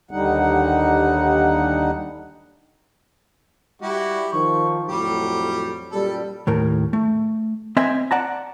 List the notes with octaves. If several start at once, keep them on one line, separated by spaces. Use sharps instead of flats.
D#2 D3 G3 D#4 F#5
G3 E4 F#4 G4
D#3 F3 C#6
F2 A2 F#3 G3 G4
F#2 A#2 G3 A4
D#2 A2 A#4
A3
C4 D#5 E5 G#5
D5 F#5 A5 A#5